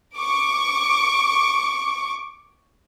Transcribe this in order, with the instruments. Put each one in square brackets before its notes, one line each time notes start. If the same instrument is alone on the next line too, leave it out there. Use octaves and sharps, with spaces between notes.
[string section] C#6 D6